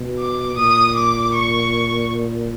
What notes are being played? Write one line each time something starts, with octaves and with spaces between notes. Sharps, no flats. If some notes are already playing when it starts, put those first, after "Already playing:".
Already playing: B2
D6
A#2 D#6
D6
C#6